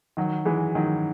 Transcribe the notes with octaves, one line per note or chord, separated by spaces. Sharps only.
D#3 F#3
E3 G#3
D#3 F#3